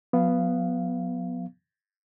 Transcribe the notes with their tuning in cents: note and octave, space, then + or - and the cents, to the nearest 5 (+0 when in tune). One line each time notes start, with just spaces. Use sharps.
F#3 -45 B3 +0 F5 -20